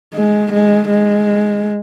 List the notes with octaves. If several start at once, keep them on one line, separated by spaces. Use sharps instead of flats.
G#3
G#3
G#3